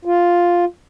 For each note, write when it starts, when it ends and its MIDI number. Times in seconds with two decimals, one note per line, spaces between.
0.05 0.65 65